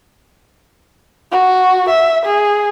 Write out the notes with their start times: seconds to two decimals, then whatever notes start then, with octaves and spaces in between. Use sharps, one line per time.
1.31 F#4
1.89 E5
2.26 G#4